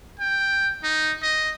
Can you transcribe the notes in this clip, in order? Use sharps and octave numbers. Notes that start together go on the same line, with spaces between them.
G5
D#4
D#5